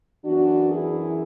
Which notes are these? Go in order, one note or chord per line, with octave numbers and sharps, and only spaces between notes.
F#2 E3 B3 D4 F#4
E4 G#4